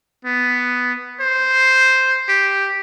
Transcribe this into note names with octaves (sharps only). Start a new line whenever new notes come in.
B3
C5
G4